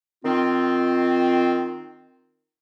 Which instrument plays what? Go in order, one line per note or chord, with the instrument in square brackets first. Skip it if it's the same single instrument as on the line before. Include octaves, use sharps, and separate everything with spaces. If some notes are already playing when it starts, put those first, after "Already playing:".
[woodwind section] D#3 C4 F4